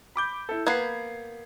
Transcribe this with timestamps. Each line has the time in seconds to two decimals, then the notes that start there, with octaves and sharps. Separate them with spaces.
0.16 B5 D6 G6
0.49 E4 A4
0.67 A#3 B3 B4 G#6 C7